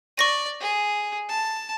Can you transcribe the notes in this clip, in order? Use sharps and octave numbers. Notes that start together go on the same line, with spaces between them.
D5 C#6 A#6 D#7
G#4
A5